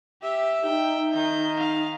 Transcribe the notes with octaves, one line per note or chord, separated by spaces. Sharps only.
G4 E5
D#4 G5
D#3 G6
F5